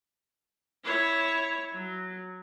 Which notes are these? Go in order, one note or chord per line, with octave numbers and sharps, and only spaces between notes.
E4 C#5
F#3